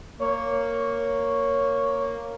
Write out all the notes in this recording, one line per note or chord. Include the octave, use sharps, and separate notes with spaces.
A#3 C#5